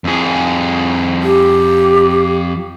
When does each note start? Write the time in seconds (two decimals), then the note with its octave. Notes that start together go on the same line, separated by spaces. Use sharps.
0.04 F2 G#4
1.23 G4